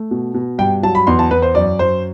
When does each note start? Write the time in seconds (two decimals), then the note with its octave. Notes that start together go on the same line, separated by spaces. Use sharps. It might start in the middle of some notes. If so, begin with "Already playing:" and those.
Already playing: A3
0.11 B2
0.34 B2
0.58 G2 G5
0.83 F#3 A5
0.95 B5
1.07 E2 C6
1.19 A5
1.30 E2 B4
1.42 C5
1.55 F#2 D5
1.79 F#2 C5